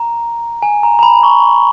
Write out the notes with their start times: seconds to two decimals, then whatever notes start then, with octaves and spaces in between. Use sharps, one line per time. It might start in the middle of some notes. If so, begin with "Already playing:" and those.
Already playing: A#5
0.62 G#5
0.83 A#5
0.99 A#5
1.03 B5
1.23 C#6